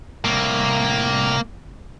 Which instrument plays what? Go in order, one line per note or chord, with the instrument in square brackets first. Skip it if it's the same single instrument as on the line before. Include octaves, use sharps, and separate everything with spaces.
[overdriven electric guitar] C2 A2 [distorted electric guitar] A#3